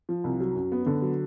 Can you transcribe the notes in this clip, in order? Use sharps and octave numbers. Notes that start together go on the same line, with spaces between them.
F3
C2
F#3
F#2
B3
D3
F#3